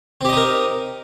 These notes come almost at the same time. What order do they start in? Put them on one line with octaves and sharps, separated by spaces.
C4 G4 D#5 D#4 A#4